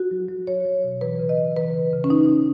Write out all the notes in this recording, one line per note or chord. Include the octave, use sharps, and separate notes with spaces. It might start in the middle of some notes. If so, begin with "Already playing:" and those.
Already playing: F#4
F#3
F#3
F#3 C#5
F#3
B2
E3 B4
C#3
D#5
C#3
E3 B4
C#3
C#3
C#4
C#3 D#4
C#3